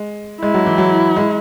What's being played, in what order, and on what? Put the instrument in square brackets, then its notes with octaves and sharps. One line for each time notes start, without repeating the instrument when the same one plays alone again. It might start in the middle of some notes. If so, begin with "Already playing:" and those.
Already playing: [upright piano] G#3
[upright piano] G#3 [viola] E4
[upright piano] F#3
E3
F#3
G#3